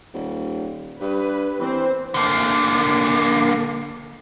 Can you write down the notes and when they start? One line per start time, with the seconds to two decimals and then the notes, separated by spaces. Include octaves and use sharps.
0.14 D#1
1.01 G2 B4
1.60 E3 C4 C5
2.14 D3 A#3